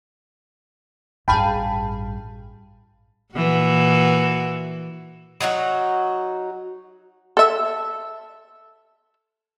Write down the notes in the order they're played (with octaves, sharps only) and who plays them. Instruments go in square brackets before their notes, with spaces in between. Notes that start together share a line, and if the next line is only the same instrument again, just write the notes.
[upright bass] A1 G2 [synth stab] G#4 F5 G5 [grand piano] A5 B5
[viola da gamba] A#2 E3 F#4
[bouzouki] F#3 D#4 E4 F#4
[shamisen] A4 E5